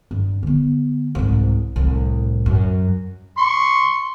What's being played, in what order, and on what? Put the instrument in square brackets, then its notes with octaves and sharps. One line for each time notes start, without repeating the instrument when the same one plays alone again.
[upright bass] G2
D3 B3
C2 G#2
C2 A2
F#2
[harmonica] C6 C#6